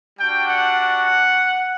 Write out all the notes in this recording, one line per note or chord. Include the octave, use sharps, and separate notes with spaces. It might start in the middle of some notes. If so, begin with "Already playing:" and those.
G3 D4 F#4 G5
F#5